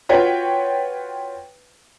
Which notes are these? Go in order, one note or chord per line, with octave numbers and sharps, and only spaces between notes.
F4 F#4 B4 C#5 G5